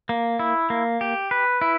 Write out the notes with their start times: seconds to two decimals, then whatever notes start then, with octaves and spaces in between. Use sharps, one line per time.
0.09 A#3
0.39 E4
0.70 A#3
1.01 G4
1.31 B4
1.61 E4